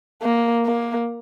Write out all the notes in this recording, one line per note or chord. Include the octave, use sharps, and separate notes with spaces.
A#3
A#3